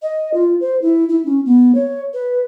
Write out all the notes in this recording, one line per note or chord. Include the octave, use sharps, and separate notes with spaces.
D#5
F4
C5
E4
E4
C#4
B3
C#5
B4